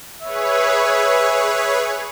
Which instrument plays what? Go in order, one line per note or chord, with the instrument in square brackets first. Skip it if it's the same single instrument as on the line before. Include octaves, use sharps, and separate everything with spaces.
[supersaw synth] G#4 B4 C#5 [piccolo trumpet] E5